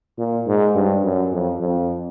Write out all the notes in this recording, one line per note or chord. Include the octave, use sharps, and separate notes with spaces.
A#2
G#2
G2
F#2
F2
F2